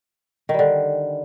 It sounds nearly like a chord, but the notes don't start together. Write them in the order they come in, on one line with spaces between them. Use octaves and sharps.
D#3 G3 D3